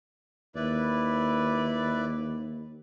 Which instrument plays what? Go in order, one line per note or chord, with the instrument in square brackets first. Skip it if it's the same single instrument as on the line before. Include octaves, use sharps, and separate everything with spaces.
[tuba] D#2 [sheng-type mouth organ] E4 B4 D5